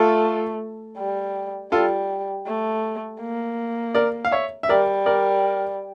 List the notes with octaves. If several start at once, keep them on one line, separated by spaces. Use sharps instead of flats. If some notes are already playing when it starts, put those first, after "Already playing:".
Already playing: A3 F4 A4
G3
G3 F4 A4
A3
A#3
A#4 D5
F5
C#5 E5
E5
G3 A#4 D5
A#4 D5